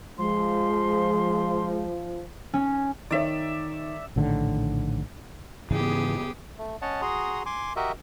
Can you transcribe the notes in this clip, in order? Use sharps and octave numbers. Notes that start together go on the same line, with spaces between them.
F3 G#3 C6
C#4
D#3 D#4 C#5 D5 E5
A#1 A2 D3 D#3
G#2 C#3 E3 B3 G4 G#4
A3
C#4 C#5 D#5 F#5 A5
F#4 G#4 A#5 C6 D#6
G#5 C6 D6
F#4 G4 A#4 D#5 E5